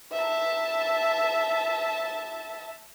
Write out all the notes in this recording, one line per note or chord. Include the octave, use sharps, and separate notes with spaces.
E5 A5